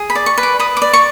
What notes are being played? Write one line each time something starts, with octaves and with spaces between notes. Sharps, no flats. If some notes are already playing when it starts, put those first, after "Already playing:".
Already playing: G#4
B5
D5
C#6
B4
D6
B4 D#6
D6
D5
C#6